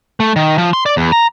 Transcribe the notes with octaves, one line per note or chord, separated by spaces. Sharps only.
A3
D#3
F3
C6
D5
E2
A#5